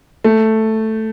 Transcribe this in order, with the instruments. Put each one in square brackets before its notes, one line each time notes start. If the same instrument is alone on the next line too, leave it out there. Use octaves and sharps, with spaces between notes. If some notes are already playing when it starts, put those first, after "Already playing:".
[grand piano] A3